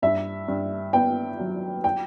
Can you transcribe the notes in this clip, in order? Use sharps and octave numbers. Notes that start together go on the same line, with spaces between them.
G2 E5
G2
B3 G5
F#3
G5